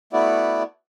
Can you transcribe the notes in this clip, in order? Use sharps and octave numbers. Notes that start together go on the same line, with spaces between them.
A3 B3 E4 F#4 D5